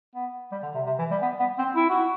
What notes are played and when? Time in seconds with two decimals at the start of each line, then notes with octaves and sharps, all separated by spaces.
0.16 B3
0.52 G3
0.63 D3
0.75 C3
0.87 C3
0.99 E3
1.11 G3
1.22 B3
1.40 B3
1.59 C4
1.76 E4
1.90 F#4